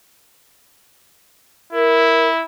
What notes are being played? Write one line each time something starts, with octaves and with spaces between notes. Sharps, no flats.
E4 A#4